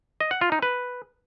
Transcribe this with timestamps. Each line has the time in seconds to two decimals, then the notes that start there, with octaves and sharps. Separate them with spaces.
0.21 D#5
0.31 F#5
0.41 F4
0.52 D#4
0.62 B4